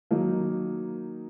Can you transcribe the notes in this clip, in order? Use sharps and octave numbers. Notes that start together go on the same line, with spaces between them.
D#3 F#3 A#3 D#4